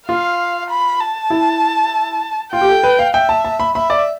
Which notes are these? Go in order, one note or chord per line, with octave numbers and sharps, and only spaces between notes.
F4 F5
B5
A5
E4
F4 G5
G4
A4
B4
F5
E5 G5
A5
A5
B5
E5 B5
D5